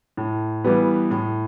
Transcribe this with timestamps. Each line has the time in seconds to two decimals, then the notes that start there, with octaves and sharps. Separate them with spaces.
0.17 A2
0.64 E3 G3 B3
1.11 A2